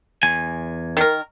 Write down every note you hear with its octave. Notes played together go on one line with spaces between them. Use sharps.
E2 G#5
D#3 A#4